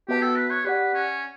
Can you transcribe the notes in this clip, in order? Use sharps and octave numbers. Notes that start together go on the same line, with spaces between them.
B3 F#4 G4 B4 E5 A5
A4
B4
C#5
G4 B4 D5 F#5
C#4